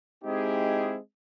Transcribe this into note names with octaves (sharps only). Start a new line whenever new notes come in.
G#3 C4 D#4 E4 G4 G#4